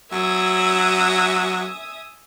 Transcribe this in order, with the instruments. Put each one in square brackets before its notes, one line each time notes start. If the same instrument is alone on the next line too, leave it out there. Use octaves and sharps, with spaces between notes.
[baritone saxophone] F#3 [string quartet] E5 G#5 D#6